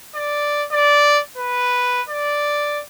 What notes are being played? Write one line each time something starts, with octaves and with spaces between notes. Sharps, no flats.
D5
D5
B4
D5